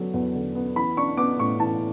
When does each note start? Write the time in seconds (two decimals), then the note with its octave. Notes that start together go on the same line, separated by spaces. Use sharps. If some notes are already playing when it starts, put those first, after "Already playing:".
Already playing: D3 F#3 B3
0.14 E2
0.35 D3
0.55 B3
0.76 E3 B5
0.97 D4 C#6
1.17 B3 D6
1.39 A2 C#6
1.60 E3 A5